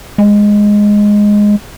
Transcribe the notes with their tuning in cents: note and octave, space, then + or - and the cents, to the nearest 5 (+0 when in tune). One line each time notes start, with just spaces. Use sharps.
G#3 -5